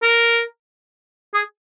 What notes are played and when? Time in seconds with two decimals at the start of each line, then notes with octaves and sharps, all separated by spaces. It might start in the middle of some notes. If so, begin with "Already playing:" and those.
0.02 A#4
1.34 G#4